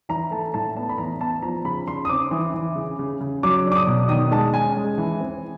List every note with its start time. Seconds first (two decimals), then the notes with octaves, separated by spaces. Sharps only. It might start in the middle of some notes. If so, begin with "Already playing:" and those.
0.09 E3 A#5
0.31 A3 A5
0.54 A2 A5
0.77 B3 A5
0.89 B5
0.98 E3 A#5
1.20 B3 A5
1.42 F3 A#5
1.65 C#3 B5
1.88 C#3 C6
2.05 D#6
2.09 C4 D6
2.31 E3
2.54 E3
2.76 C#3
2.99 C#3
3.21 C#3
3.43 F#3 D6
3.66 D4
3.72 D6
3.76 D#6
3.87 B2
4.09 D#3 D#6
4.31 G#3 A5
4.54 C#4 G#5
4.77 G#3
4.98 E3
5.20 C4